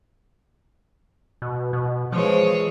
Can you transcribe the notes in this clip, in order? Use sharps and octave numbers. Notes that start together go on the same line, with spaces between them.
B2
B2
E3 F3 G#3 C#5